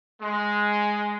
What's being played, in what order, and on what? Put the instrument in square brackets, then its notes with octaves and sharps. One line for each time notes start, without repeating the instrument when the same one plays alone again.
[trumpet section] G#3